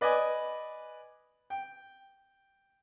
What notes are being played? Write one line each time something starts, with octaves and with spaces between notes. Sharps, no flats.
B4 D5 D#5 G#5
G5